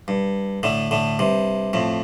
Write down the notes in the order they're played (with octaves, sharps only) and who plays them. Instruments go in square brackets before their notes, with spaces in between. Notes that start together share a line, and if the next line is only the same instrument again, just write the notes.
[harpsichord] G2
A2 D3
A2 D3
G2 C3
F2 A2